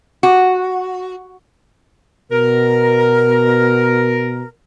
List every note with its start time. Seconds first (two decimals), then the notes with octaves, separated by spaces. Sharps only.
0.23 F#4
2.32 B2 A#4